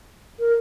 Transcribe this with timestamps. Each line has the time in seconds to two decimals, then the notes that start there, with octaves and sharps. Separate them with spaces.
0.39 A#4